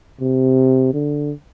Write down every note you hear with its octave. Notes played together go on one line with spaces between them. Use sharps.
C3
D3